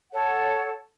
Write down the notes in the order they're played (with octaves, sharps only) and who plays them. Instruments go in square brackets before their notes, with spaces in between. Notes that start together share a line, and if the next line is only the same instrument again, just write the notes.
[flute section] A4 C#5 F#5